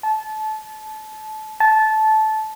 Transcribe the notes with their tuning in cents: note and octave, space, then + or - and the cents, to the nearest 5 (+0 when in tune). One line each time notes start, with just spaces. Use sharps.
A5 -25
A5 -15